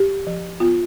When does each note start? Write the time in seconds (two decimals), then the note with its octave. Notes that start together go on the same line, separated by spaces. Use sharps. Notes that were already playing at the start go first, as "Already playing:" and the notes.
Already playing: G4
0.27 F3
0.60 B3 F4